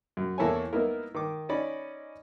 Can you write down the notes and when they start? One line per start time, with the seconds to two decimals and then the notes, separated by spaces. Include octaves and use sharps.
0.17 F#2
0.38 E2 A#3 E4 A4 C#5 G#5
0.73 A#3 B3 D#4 E4 A#4
1.15 D#3 D6
1.49 C#4 D#4 D5 B5